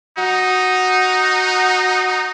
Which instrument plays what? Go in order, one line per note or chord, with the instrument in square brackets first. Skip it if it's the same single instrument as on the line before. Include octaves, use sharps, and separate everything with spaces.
[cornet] D#4 [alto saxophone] F#4